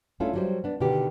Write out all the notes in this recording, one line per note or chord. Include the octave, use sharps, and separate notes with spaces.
A3 C#4 D4 E4 F4 A4
F#3 G3 C5
B3 D4
B2 D3 D#3 F#4 G4